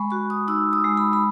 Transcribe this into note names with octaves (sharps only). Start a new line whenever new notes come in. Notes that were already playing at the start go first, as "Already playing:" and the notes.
Already playing: G#3 B5 C#6
F#4 C#6
D#6
D#4 E6
D#6
G#3
B5
B5